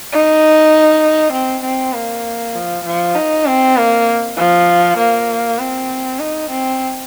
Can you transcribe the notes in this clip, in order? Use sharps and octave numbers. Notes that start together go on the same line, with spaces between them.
D#4
C4
C4
A#3
F3
F3
D#4
C4
A#3
F3
A#3
C4
D#4
C4